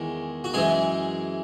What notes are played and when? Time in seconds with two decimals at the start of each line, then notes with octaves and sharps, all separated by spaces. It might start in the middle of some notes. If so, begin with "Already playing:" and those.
Already playing: E2 D#3 G#3
0.44 F#4
0.54 F#2 E3 G#3 G#4